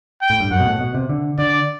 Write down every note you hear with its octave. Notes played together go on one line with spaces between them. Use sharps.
G5
A2
G2
F#2 F#5
B2
A2
B2
C3
D3
D3 D5